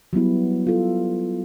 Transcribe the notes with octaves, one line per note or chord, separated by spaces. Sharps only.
F#3 G3 B3 E4
F4 A4